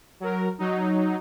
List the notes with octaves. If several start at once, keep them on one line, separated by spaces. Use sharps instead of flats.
F#3 A#4
F#3 D#4